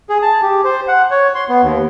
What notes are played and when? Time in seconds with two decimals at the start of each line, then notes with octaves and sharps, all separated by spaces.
0.10 G#4
0.22 A5
0.42 G4
0.65 C5
0.88 F#5
1.11 C#5
1.35 C6
1.49 B3
1.63 D#2